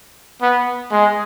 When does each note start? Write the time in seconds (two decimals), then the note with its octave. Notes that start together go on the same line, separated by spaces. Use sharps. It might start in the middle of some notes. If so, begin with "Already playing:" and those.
0.42 B3
0.91 G#3